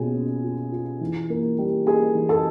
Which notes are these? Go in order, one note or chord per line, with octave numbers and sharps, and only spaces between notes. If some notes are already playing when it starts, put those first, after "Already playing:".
Already playing: B2 C#4 F4 G#4 G#5
C#4
F4
F4
E3
A#3
G3
A#3 G#4 G#5
E3
A4 A5